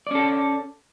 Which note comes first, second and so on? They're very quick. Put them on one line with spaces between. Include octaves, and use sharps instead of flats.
D5 C#4 A4